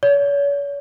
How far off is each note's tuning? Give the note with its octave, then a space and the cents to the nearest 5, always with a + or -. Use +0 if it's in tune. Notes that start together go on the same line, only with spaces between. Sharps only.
C#5 +40